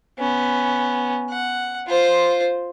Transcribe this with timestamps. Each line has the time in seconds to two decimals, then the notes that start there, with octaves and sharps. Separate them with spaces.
0.19 B3 C#4
1.30 F#5
1.88 F4 C5